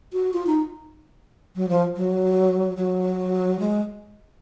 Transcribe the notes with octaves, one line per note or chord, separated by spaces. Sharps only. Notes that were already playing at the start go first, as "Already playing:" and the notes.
F#4
F4
D#4
F#3
F3
F#3
F#3
G#3